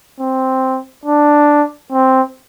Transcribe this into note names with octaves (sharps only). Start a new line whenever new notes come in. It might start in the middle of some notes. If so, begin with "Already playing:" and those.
C4
D4
C4